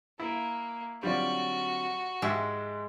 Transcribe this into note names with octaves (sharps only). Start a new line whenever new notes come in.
A#3 E4
D3 F#3 G3 C4 F4 F#4 D5
G#2 G#3 G4 E5 E6